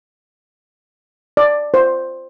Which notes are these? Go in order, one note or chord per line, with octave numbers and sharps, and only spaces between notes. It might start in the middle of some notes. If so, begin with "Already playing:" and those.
D5
C5